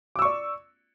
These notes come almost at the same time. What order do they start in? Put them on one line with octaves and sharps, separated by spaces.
D6 E6 C#6 D5